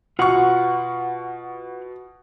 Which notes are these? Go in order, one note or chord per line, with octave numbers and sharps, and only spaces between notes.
B2 F4 B4 F#5 C#6